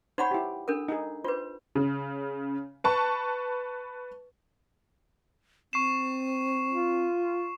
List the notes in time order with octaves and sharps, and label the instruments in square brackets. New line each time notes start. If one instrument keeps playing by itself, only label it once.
[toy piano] D#4 F#5 B5 [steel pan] C5 C#5
[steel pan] E4 G4
[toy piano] D4 A4 A#4
[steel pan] D#4 G#4
[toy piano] F4 B4 [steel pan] C5
[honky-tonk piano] C#3
B4 A5 C#6
[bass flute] C4 [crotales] C#6 C7 E7
[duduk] F4